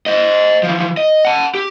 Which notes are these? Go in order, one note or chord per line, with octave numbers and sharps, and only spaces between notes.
C5 D#5
E3 F3
D#5
F#5 A5
G4